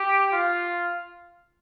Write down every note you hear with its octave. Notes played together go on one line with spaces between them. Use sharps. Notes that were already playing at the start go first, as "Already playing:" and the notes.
Already playing: G4
F4